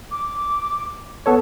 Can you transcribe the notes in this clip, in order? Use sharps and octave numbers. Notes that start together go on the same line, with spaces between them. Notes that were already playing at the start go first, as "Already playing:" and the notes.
D6
B3 A4 C#5 A5